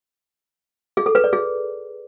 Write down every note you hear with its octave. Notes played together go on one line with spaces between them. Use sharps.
G#4
A4
B4
D5
G#4